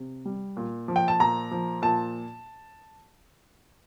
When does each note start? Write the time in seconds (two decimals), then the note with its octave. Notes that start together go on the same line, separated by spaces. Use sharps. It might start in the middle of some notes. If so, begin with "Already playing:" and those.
Already playing: C3
0.25 G3
0.57 A#2
0.88 F3
0.96 G5
1.08 A5
1.20 A#2 A#5
1.51 F3
1.82 A#2 A5